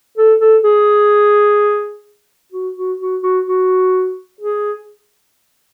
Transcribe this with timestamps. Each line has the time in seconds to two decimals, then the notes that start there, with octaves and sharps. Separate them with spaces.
0.18 A4
0.41 A4
0.64 G#4
2.52 F#4
2.76 F#4
3.00 F#4
3.23 F#4
3.47 F#4
4.41 G#4